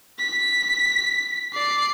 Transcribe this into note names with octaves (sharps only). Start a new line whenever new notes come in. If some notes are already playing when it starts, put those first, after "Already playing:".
B6
D5 C7